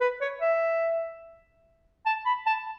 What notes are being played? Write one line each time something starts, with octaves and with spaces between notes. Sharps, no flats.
B4
C#5
E5
A5
B5
A5